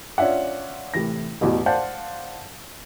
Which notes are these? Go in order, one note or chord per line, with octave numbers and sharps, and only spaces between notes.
C#4 D4 F4 E5 F#5
A2 C3 E3 A#6
A1 E2 B2
C5 D5 F5 F#5 A5 G6